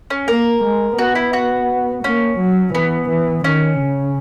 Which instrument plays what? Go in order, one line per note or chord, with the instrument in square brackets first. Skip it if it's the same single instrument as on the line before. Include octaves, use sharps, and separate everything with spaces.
[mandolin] C#4
[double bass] A#3 [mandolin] A#4
[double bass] G#3
[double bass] B3 [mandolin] F#4
[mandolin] E4
F#4
[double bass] A#3 [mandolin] C#4
[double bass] F#3
[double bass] E3 [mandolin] B3
[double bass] E3
[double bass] D#3 [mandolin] C#4
[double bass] C#3